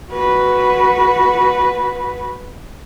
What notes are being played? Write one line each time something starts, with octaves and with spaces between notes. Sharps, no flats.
F#4 B4